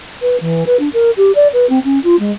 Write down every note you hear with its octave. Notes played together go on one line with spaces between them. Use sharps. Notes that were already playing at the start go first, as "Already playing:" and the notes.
B4
E3
B4
D4
A#4
G4
D5
B4
C4
C#4
F4
G#3